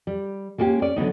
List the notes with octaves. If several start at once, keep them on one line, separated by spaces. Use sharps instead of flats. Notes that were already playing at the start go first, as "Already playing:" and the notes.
G3
G#3 A#3 C#4 F#4 G4
C#4 D5
D3 F#3 B3 D#4